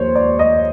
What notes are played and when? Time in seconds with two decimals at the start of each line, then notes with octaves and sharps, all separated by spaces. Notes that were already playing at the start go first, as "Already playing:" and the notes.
Already playing: D#2 F3 A#3 C5 C#5
0.15 D5
0.39 D#5